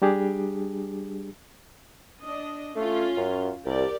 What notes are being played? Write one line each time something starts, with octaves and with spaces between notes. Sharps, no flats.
G3 D4 G4 G#4
D4 D#5
A3 C#4 F4
F#2
C2 G4 A#4 D5